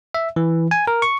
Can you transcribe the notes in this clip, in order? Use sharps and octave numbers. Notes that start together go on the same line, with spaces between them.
E5
E3
G#5
A#4
C#6